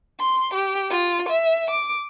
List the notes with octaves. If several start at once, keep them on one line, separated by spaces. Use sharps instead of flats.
C6
G4
F4
E5
D6